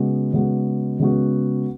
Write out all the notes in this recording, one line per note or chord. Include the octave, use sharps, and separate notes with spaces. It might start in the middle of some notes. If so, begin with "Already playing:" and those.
Already playing: C#3 G#3 B3 F#4
C#3 G#3 B3 F#4
C#3 G#3 B3 F#4